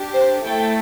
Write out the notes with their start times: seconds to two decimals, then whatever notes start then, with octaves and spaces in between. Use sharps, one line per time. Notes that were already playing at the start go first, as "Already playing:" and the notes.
Already playing: D4 G4
0.14 C5
0.44 A3 E4 A4 G5